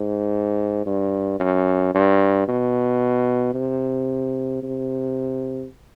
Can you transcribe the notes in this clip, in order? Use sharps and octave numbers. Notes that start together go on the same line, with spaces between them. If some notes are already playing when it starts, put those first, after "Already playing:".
Already playing: G#2
G2
F#2
G2
B2
C3
C3